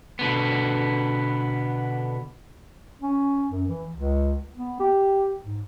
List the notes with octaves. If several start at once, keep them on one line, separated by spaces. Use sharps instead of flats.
B2 D3 B3
C#4
F#2
E3
C#2
B3
G4
G#2